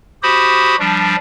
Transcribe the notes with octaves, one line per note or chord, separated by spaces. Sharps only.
F#4 G4 C5 B5 D#6
F3 G3 D4